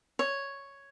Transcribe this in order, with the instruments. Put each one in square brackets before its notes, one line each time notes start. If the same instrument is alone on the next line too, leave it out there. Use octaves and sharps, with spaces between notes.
[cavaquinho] C#5